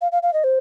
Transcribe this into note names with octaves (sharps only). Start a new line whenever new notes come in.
F5
F5
F5
D#5
C5